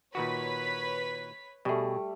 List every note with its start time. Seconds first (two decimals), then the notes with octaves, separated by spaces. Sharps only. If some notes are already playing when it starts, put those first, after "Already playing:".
0.15 A#2 D#3 F#4 B4 C#5 B6
1.65 B2 G3 A3 G#4